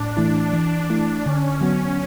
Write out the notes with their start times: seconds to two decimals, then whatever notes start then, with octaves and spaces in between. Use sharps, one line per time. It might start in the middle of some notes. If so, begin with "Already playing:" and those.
Already playing: A2 D4
0.17 E3 A3 E4
0.53 E3
0.90 A3 E4
1.26 D3 C#4
1.61 F#3 B3 F#4